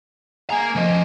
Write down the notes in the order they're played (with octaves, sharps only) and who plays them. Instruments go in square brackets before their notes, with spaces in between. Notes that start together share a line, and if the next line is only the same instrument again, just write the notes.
[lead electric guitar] A#3 A#5 [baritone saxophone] G#4
[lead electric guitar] F3 D#5 [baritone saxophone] C#4